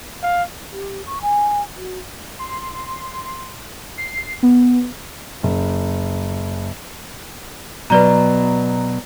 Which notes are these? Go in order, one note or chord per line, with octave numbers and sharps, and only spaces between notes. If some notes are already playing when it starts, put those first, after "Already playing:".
F5
G4
C#6
G#5
F#4
C6
C7
B3
F#1
B2 F#3 B4 D5 A#5